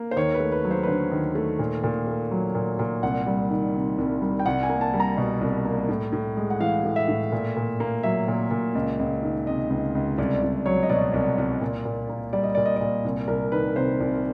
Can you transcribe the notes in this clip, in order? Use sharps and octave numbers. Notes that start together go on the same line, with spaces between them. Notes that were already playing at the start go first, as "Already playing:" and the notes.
Already playing: A#3
C5
D#2 C#5
B4
A3
B4
F#3
C5
B4
D3 C5
D#2
A3
A#2
A#2
A3
F#3
A#2
A#2
C2 F#5
G3
D#3
C3
C2
G3
G5
C2 F#5
G#5
A#3
A5
G3
A#5
B2
C2
A#3
A2
A2
G#3
F#5
E3 F5
A2
E5
A2
A#2
A#2
A#3
F#3 E5
A#2
A#2
C#2
C#2
D#3
C3 D#5
C#2
C#2
C2 D5
C2
F#3 C#5
D#5
B2 D5
C2
C2
A#2
A#2
A#3
G3 D5
D#5
A#2 D5
D#5
A#2 D5
C2
C2 A#4
D#3 B4
C3 C5
C2